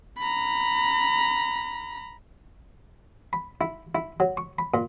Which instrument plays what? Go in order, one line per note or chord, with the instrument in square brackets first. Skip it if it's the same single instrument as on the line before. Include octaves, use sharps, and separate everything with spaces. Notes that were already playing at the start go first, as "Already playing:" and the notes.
[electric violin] A#5 B5
[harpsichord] B5
E4
E4
F#3
C#6
B5
A#2